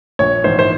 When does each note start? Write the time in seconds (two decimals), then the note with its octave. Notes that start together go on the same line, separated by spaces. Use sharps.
0.19 A#1 C#5
0.44 G#2 E3 C5
0.59 C5